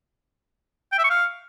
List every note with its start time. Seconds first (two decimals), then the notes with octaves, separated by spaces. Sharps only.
0.92 G5
0.98 E5
1.04 C#6
1.10 F5